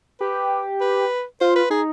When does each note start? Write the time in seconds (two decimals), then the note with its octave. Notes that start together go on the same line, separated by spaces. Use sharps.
0.20 G4 B4
0.81 B4
1.41 F4 C5
1.56 B4
1.70 D#4 G#4